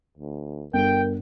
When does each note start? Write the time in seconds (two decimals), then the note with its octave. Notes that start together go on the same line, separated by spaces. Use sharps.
0.18 D2
0.73 G1 A#4 G5